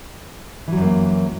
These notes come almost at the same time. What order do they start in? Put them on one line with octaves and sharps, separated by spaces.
E3 F#3 F#2 A#3